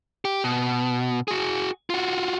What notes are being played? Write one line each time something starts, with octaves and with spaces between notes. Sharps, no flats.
G4
B2
F#4 G#4
F4 F#4